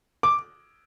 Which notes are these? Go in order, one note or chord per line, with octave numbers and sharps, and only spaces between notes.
D6